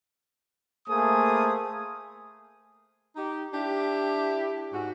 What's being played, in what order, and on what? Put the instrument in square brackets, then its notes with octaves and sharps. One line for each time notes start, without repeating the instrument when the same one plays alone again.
[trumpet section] A3 A#3 G#4 C5 D#6
[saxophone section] D#4 G4
D4 E4 G4
G#2 F#4